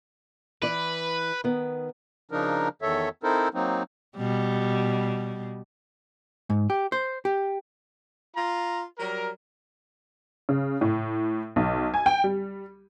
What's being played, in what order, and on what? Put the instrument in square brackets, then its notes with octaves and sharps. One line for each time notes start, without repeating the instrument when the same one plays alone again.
[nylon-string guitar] E3 D5 [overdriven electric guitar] B4
[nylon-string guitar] D#3 B3
[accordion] C#3 F3 D4 D#4 A#4
E2 D#3 A4 C#5 E5
C4 D#4 E4 A4 A#4 C5
F#3 A#3 C4 D#4
[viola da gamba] B2 G3
[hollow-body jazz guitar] G#2
G4
C5
G4
[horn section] F4 A#5
F#3 G3 A#4
[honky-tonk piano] C#3
A2
B1
G#5
G5
G3